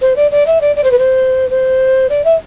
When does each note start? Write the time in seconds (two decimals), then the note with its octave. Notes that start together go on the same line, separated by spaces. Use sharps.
0.01 C5
0.16 D5
0.31 D5
0.46 E5
0.61 D5
0.76 D5
0.84 C5
0.91 B4
0.98 C5
1.50 C5
2.09 D5
2.24 E5